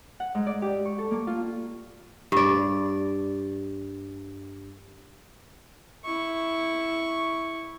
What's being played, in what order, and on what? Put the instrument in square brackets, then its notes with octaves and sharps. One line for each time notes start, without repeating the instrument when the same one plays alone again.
[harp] F#5
G#2
D5
G4
C#6
A4
A#3
F4
[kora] G2 D5
[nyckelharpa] E4 C#6